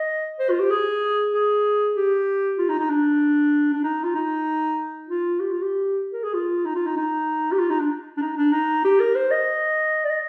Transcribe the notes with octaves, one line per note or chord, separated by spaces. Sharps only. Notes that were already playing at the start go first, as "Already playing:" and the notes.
Already playing: D#5
C5
F4
G4
G#4
G#4
G4
F4
D#4
D#4
D4
D4
D#4
F4
D#4
F4
G4
F4
G4
A#4
G#4
F4
D#4
F4
D#4
D#4
G4
F4
D#4
D4
D4
D#4
D4
D#4
G4
A#4
C5
D#5
D5
D#5